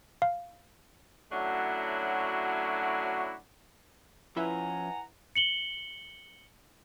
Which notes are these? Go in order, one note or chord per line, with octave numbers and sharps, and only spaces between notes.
F5
F#3 A3 C#4 D4 E4 F#4
F3 C#4 E4 B4 E5 F#5 G#5 A#5
C#7 F#7 G7